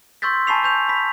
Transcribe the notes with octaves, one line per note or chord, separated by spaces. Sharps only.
C6 C#6 E6 G6 A6 B6
G#5 A5 B5 C#6 C7 F7
C#6 G6 F7
B5 B6